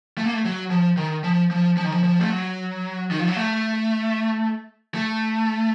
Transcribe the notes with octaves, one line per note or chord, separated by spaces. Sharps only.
A3
A#3
A3
F#3
F3
D#3
F3
F3
F3
D#3
F3
F3
A3
F#3
D#3
F3
F#3
A3
A3